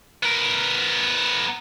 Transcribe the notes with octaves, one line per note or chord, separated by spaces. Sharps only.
B3 A#4